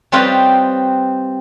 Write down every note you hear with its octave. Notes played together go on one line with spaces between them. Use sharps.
G3 C4 F4 B4 C#5 D#5